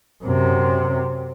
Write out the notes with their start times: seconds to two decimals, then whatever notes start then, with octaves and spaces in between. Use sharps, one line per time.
0.24 F#2 C3